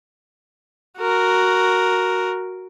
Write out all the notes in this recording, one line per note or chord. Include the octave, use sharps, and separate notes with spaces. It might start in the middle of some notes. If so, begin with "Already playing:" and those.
F#4 A#4